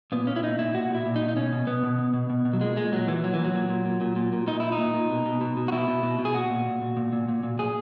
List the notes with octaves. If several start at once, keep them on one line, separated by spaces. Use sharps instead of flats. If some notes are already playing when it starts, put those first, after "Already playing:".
A#2 B3
A#2 C#4
E4
A#2 D#4
A#2 E4
A#2 F#4
A#2 E4
A#2
D#4
A#2
D#4
B2 C#4
B2
B2 B3
B2
B2
B2
B2
B2
F#3
A#2 G#3
A#2 G#3
A#2 F#3
A#2 E3
A#2 F#3
A#2 E3
F#3
A#2
A#2
A#2
A#2
A#2
A#2
A#2 D#4
A#2 E4
D#4
A#2
A#2
B2
B2
B2
B2
F#4
B2 E4
B2
B2
B2
G#4
A#2 F#4
A#2
A#2
A#2
A#2
A#2
A#2
A#2
A#2 G#4